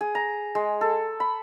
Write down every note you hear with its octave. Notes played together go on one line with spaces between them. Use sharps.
G#4
A#5
G#3
A4
B5